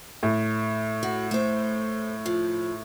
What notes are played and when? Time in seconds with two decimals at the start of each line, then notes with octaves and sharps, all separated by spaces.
0.23 A2
1.03 F#4
1.31 A3 C5
2.26 F3